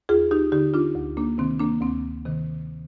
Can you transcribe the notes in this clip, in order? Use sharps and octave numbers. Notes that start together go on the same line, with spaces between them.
D#2 F4 G#4
D#4 G4
D3 D#4 G4
D4 F4
D2
A#3 D4
C3 D#3 C4
A#3 D4
D2 C4
C3 D#3